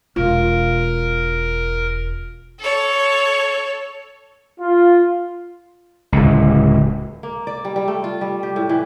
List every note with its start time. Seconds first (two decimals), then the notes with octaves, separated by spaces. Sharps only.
0.16 E1 F4 A#4
2.60 A4 C#5
4.60 F4
6.12 D1 C#2
7.23 A#3
7.47 D5
7.65 G3
7.76 G3
7.88 A3
8.04 F4
8.21 G3
8.43 G4
8.56 A2
8.69 E3